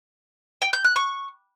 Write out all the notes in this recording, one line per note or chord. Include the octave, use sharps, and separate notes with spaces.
G5
G6
F#6
C#6